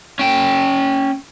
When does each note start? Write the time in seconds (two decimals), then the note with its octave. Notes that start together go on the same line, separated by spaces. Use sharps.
0.19 C#4 G5